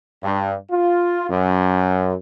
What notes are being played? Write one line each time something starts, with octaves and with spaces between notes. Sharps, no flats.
G2
F4
F#2